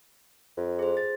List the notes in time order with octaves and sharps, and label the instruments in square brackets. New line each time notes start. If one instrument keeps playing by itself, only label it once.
[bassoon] F2
[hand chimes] G#4 C5
A6